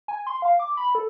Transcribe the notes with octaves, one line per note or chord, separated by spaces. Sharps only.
G#5
C6
F5
D6
B5
A4